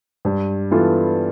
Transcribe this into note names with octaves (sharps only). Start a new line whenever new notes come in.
G2
E3 B3 F4 A4